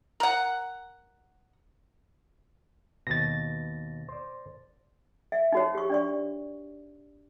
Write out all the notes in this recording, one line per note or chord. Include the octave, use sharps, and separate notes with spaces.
A#4 F#5
D#2 B2 A6 A#6
C5 D5
E5
D#4 F#4 C#5
G4 C#6
D4 D5 C#6